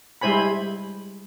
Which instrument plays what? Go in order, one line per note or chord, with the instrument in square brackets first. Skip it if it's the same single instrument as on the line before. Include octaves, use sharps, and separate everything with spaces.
[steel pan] G3 G#3 E4 C5 G#5 B5